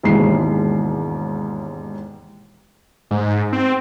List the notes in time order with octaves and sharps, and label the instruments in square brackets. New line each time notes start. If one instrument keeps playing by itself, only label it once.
[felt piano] E1 D#2 G#2 E3 G#3 C7
[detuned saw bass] G#2
C4